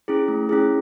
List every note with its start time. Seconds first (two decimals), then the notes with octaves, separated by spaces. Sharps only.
0.08 C#4 E4 G#4
0.28 A3
0.49 C#4 E4 G#4